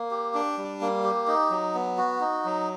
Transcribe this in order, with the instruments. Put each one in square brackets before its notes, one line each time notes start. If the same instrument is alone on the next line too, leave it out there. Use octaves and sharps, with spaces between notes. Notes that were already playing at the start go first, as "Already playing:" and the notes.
Already playing: [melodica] A#3
G4
D4
G3
A#3
G4
D#4
F#3
B3
F#4
D#4
F#3